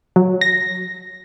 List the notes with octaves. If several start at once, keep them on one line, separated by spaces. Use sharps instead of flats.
F#3
A#6